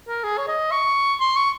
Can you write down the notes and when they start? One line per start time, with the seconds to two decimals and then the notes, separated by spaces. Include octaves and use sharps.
0.08 A#4
0.24 G#4
0.37 C#5
0.48 D#5
0.72 C#6
1.20 C6
1.36 C#6